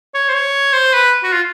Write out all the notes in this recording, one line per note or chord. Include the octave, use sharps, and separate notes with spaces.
C#5
C5
C#5
C5
B4
F#4
F4